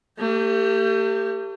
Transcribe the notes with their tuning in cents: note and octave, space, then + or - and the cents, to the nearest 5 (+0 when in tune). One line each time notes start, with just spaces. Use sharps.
A3 +40 G4 +0